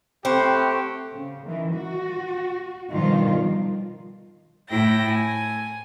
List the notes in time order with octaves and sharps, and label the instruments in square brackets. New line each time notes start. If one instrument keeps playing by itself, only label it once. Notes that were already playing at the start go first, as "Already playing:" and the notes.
[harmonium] A3 F#5 [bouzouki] C4 [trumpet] G4 [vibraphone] B5 C#6
[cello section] C#3
D#3 E3
F#4
G2 B2 D#3 F3 G3 F4
[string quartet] A2 A3 E4 G5 A#6
G#5